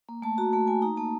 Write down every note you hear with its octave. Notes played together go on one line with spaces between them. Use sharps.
A#3
A3 A5
F#4 A#5
A3 A5
A3 G#5
D#4 A#5
A#3 A5